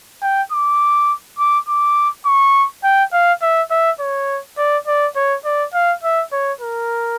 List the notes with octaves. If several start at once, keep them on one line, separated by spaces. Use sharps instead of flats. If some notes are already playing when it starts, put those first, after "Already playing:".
G5
D6
D6
D6
C#6
G5
F5
E5
E5
C#5
D5
D5
C#5
D5
F5
E5
C#5
A#4